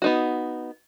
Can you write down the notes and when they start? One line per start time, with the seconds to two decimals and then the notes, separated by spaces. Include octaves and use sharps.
0.02 B3 D#4 F#4